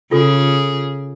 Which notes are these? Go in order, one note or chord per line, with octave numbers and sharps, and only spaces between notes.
C#3 F4 G#4 A4